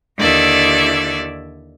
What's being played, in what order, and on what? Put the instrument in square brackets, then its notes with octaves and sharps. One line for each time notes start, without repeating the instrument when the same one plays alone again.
[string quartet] D#2 D3 E4 D5 E5